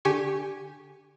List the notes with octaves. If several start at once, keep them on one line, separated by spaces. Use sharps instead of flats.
D3 G4 G#5 C#6